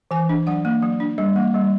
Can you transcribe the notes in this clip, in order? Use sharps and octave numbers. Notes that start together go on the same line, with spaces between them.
E3 G#5
D4
F#3 F#5
A#3
F#3
D4
G3
A#3
G3